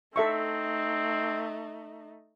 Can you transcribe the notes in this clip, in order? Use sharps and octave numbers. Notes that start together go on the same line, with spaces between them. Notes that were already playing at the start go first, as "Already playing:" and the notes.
A3 C4 D#4 A4 E5 C#6